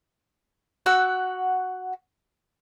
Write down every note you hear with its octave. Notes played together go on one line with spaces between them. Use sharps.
F#4 F#5 E6